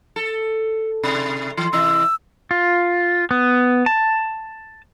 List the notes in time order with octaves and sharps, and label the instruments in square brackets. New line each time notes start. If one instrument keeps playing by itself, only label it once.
[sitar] A4
C3
E3
[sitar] C3 E3 D#5 [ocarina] E6
[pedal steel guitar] F4
B3
A5